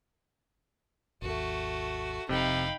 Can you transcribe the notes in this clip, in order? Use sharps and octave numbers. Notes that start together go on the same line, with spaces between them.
G#1 D#2 A3 F#4
F1 F2 C3 D#4 F5 G5 B5